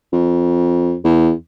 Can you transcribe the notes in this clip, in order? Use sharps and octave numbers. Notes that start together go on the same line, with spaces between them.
F2
E2